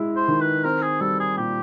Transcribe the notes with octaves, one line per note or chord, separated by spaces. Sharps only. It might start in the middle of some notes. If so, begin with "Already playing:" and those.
Already playing: G#3 E4
C5
D#3
B4
C4 A#4
G#4
G3 A4
G#4
A#2 G4